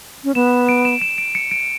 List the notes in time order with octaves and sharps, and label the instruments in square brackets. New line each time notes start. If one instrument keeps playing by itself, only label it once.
[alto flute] C#4
[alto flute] B3 [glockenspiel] E7
[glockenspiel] D7
E7
E7
D7
C#7
D7